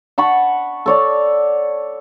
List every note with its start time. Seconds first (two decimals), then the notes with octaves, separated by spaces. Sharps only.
0.18 F#5 A5 B5 C#6
0.86 A4 C#5 D5